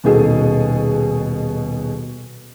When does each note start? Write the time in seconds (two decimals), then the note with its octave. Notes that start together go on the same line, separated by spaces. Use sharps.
0.04 D#1 B2 D#4 G#4 A4